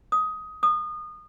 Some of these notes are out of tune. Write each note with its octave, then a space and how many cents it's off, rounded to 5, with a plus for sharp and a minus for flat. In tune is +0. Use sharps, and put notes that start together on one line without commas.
D#6 +15
D#6 -25